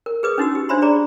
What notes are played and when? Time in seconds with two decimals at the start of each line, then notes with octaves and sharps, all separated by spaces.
0.06 A#4
0.23 G#4 B4 D#6
0.38 C#4 D#4 F#4 E6
0.55 G4
0.69 D4 C5 E5 B5 C6
0.82 G#4 D5 A#5